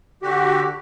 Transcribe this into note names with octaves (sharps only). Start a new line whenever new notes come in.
D3 F#4 G4